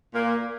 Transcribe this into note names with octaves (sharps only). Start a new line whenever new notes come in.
A#2 A#3